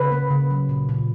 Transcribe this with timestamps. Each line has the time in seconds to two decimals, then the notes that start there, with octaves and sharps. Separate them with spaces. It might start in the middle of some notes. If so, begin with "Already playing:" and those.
Already playing: C#3 B4
0.12 A#3
0.31 C#3
0.50 F#3
0.69 A#2
0.89 A#2